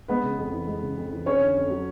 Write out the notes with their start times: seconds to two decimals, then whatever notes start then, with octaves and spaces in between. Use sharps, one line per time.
0.08 G#3 B3 B4
0.23 C#3
0.38 F2
0.53 E3
0.67 G#3
0.82 C#3
0.97 F2
1.12 E3
1.26 F2 C#4 C#5
1.40 D3
1.56 F2
1.70 F#3